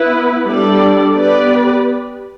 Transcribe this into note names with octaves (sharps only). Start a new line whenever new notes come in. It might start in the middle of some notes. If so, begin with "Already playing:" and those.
Already playing: B3 E4 B4
G3 D4 A4 D5
B3 G4 B4 D5